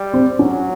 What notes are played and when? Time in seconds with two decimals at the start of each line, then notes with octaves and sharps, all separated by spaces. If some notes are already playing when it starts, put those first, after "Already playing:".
Already playing: G3
0.13 C4
0.39 F#3 C#4